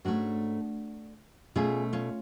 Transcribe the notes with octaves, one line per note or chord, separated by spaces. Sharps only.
G#2 F#3 A3 C#4 D4 F#4
B2 A3 C#4 F4 G#4
C#4 F4